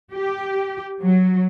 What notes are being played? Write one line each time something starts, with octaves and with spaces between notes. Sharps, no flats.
G4
F#3